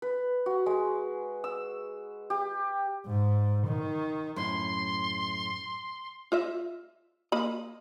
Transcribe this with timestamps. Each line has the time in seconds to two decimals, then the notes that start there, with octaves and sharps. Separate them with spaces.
0.02 B4
0.46 F#4
0.66 G#3
1.44 E6
2.30 G4
3.07 G#2
3.67 D#3
4.36 F#2 A2 C6
6.32 F4 D#5 E5
7.32 A#3 D#5 B5